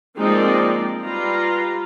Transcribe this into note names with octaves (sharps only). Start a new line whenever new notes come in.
F3 G#3 A#3 C4 D#4 D5
G3 F4 B4 A#5